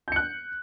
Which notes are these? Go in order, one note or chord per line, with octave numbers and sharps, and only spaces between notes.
F#6 G6 C#7